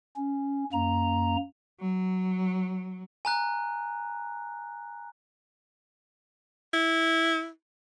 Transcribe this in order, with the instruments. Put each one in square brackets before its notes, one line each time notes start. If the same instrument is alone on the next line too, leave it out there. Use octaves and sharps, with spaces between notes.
[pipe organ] C#4
F#2 A#3 A#5
[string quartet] F#3
[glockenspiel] G#5 A#5 F#6
[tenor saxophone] E4